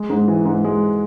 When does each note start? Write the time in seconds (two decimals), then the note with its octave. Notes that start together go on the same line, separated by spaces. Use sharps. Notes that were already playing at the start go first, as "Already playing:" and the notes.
Already playing: G#3
0.10 G#2
0.28 E3
0.45 G#2
0.65 G#3